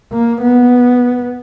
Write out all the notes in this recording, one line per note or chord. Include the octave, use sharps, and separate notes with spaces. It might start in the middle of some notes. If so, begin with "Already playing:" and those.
A#3
B3